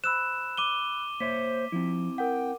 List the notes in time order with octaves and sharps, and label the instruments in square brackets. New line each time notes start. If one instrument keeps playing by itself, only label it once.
[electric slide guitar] C5 [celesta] B5 E6 F#6 [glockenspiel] E7
[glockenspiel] D6 D#7 G7
[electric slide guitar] A#3 C#5 E5 [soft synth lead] C5 [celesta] B6
[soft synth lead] F3 [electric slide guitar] C4 E4
[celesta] A#4 F#5 [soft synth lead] G5